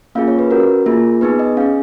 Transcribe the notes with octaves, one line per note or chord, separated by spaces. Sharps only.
A#3 C#4 F4 G#4 F5
C#5
B4
C#4 F#4 A#4
A#3 F4 G#4
B3 D#4 G#4 B4
D#5
C#4 G#4 F5